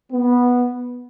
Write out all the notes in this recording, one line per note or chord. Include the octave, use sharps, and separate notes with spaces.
B3